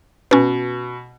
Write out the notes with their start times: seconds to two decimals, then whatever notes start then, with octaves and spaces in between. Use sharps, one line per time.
0.31 B2 C#4 B4